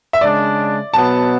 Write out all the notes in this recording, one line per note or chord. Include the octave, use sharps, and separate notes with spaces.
E5
C#3 G#3 D4 D5
B2 F#3 B3 A5